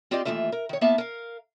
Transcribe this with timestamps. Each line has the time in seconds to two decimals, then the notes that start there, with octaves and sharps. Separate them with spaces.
0.11 C4 F4 G4 D5 D#5 F5
0.25 D#2 D#3 E3 A3 F4 E5
0.52 A#4
0.69 D#3 C#5
0.81 A#3 B3 E4 E5 F5 A5
0.98 A#4 F5